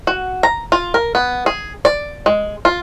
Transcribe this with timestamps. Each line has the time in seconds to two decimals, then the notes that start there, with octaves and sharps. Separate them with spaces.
0.07 F#4
0.43 A#5
0.72 F4
0.94 A#4
1.15 B3
1.46 G#4
1.85 D5
2.26 G#3
2.65 F4